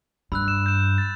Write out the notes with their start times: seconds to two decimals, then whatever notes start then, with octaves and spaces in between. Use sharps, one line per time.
0.32 G2 B5 E6 F#6
0.48 E7
0.66 G6 E7
0.98 A6